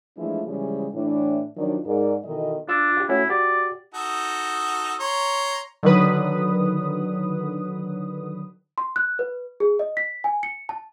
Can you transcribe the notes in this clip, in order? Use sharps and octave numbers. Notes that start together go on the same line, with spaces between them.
E3 F3 G#3 A3 D4 E4
C#3 E3 F3 G3 G#3
A2 E3 D4
D#3 F3 F#3 D4
G#2 A#4 D5
B2 D#3 E3 D#4 A4 D#5
D4 F4 E6
F4 G4
A3 C#4 E4 F#4
F#4 G4 D5
D#4 F#4 A4
C#5 A#5 C6
D3 D#3 F#3 B4 D#6
C6
F#6
B4
G#4
D#5
B6
G#5
C#7
A5